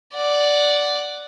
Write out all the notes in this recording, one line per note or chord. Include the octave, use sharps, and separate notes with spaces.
D5 F#5